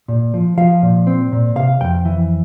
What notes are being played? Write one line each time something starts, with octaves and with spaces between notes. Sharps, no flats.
A#2
F3
F3 F5
A#2
C4
A#2
C3 F5
F2 G5
E3